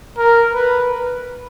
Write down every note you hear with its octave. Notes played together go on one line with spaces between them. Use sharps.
A#4
B4